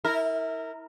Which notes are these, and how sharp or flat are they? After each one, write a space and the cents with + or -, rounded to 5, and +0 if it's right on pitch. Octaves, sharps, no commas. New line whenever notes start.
E4 -30 A#4 -20